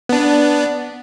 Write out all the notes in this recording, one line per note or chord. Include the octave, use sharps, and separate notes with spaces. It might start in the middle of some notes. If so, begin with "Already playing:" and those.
B3 D4